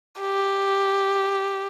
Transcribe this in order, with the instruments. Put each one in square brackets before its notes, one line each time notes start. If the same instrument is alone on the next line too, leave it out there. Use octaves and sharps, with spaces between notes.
[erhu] G4